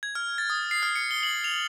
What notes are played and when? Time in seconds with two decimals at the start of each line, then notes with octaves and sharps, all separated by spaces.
0.03 G#6
0.15 F6
0.38 A6
0.50 D#6
0.71 C7
0.83 F6
0.96 C#7
1.11 G7
1.23 F#7
1.44 F7